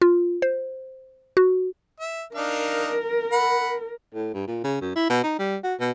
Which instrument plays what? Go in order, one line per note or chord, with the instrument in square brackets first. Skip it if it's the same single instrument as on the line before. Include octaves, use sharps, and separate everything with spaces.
[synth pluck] F4
C5
F#4
[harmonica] E5
[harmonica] D4 D#4 F5 [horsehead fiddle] A#4
[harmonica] F#5 B5
[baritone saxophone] A2
G2
A#2
C#3
F#2
E4
B2
D#4
G3
F#4
B2